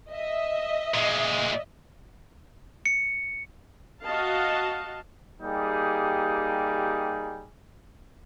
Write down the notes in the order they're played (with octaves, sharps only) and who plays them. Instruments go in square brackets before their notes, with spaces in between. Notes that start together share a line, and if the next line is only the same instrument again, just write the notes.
[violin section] D#5 E5
[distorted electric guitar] A#2 G#3
[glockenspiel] C#7
[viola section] F#4 D#5 F5 A5
[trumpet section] G3 A#3 D#4 G4 G#4